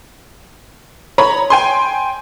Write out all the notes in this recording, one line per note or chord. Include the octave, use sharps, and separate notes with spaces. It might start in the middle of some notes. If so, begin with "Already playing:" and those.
C#5 A#5 B5
G5 G#5 C6